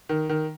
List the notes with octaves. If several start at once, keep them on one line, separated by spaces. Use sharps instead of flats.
D#3
D#3